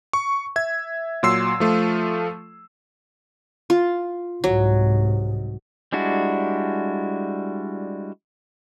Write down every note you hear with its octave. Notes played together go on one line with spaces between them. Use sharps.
C#6
E5 G#6
A#2 F#3 C6 E6 C7
F3 A3 F4
F4
C2 G#2 F#3
G3 G#3 D4 E4 F#4